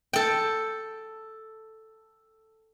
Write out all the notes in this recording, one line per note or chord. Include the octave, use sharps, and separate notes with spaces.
A4 G5